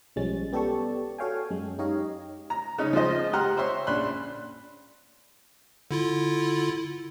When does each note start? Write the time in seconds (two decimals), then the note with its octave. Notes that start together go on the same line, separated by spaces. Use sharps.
0.16 B1 F3 G3 G#3 C#4 A6
0.53 B3 G4 A4 D5 A5 C#6
1.18 F#4 A4 C#5 F5 G5 G#5
1.50 F#2 G#3
1.79 D#4 G4 C#5 D#5 F5
2.50 A#5
2.78 C#3 C#4 D#4
2.93 F3 G#3 C5 D#5
3.33 G4 F#5 A#5 C6 F6
3.57 C5 C#5 E5 C6
3.87 A#1 C#4 D4 B5 C6 F#6
5.91 D3 E4 F4